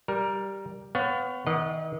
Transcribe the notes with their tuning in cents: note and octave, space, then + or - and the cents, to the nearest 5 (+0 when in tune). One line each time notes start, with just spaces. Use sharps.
G3 +0 A#4 +15
B3 +30 C#5 +0 F5 +30
D#3 +40 D#5 -30 F#5 +0